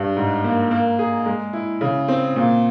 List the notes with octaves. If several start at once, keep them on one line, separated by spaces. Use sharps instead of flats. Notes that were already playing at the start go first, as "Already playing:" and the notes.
Already playing: G2
G#2
A#3
A#3
G#4
G#3
E4
C#3
C4
A#2